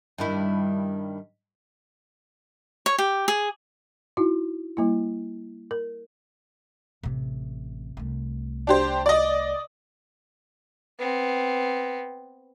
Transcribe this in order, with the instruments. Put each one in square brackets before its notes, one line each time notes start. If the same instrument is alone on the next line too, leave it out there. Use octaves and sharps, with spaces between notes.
[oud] G2 D#3 E4
[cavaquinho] C#5
G4
G#4
[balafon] D#4 E4 F#4
G3 A#3 E4
A#4
[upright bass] A1 C3
C2 A3
[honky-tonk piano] D4 G4 C5
D5 D#5
[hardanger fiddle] B3 C4